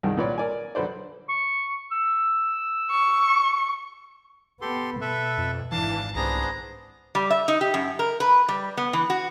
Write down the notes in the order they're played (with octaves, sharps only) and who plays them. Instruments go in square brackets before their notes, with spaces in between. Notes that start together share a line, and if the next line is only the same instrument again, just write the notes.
[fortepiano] C2 G2 D#3 G#3
A#2 F4 B4 C#5 D5
A#4 D5 G#5
B1 D3 B4 C5 D5
[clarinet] C#6
E6
[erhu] C#6
[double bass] B3 [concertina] G4 A4 C6
[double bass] B2 [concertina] A4 B4 E5
[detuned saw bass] F2
[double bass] G#1 [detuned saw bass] E3 [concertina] D4 F5 [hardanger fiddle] A5
[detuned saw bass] C2 [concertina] B3 D4 G#4 [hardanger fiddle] C5 A#5
[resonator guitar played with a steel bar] G3
E5
D#4
G4
F#2
A#4
B4
G3
B3
E3
F#4